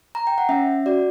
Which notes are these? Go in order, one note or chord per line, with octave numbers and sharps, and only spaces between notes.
A#5
G5
F#5
C#4 E5
F#4 D5